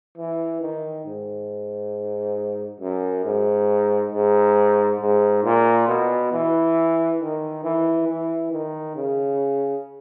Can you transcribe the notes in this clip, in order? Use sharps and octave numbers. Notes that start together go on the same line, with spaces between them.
E3
D#3
G#2
F#2
G#2
G#2
G#2
A#2
B2
E3
D#3
E3
E3
D#3
C#3